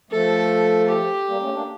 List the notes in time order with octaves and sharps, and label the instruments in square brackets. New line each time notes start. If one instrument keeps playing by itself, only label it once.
[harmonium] F3 A3 [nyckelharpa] A4
[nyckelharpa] G4
[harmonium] G3 A#3
A3 C#4
A#3 D4